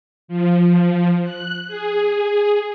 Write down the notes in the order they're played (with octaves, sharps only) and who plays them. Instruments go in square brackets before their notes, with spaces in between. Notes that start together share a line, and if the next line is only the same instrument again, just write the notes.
[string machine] F3
F#6
G#4